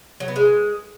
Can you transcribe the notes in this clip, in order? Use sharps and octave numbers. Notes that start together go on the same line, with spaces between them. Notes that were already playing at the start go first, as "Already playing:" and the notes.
F#3
B3
G#3